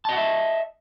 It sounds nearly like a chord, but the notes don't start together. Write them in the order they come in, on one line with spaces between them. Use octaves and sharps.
A5 D#5 F#5 E5